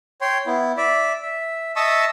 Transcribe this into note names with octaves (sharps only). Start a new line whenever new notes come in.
C#5 G5 C6
B3 E4
D5 E5
E5
D#5 E5 A5 C#6 D#6 E6